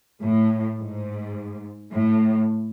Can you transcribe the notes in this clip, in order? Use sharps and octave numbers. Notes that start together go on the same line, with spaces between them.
A2
G#2
A2